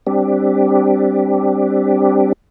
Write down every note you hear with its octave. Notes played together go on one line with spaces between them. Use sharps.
G3 C4 D4 G4